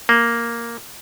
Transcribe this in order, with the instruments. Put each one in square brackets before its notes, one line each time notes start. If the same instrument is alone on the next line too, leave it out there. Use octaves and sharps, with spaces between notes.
[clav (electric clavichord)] A#3